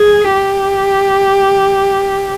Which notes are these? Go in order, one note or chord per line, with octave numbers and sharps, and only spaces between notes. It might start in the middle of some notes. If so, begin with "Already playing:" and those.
Already playing: G#4
G4